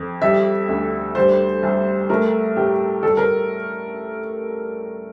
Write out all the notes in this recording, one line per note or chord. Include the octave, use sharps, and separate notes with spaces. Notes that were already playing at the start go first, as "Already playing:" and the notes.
Already playing: F2
G3 E5
D2
G3 C5
C2
A3 A#4
A2 G4
G3 A4
A#4